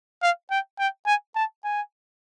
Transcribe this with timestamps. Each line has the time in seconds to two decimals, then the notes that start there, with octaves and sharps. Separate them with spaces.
0.22 F5
0.51 G5
0.79 G5
1.06 G#5
1.35 A5
1.64 G#5